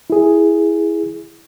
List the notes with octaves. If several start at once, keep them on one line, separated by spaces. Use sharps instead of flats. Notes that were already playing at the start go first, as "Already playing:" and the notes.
E4 G#4